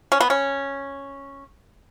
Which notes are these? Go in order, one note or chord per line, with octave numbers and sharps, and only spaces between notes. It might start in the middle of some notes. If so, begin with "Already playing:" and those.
C#4
B3
C#4